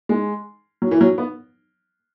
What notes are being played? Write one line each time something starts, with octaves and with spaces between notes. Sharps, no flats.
G#3
F#3
E3
F#3
B3